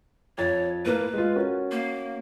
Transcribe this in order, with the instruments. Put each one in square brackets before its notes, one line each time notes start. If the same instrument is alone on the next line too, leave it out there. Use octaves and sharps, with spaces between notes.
[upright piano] F2 A6 [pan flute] C#5
[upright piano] A2 A#3 [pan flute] B4
[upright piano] G#3 F4
C#4 F#4 A#4
[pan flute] A#3